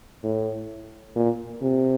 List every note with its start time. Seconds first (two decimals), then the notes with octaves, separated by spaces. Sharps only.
0.24 A2
1.15 A#2
1.62 C3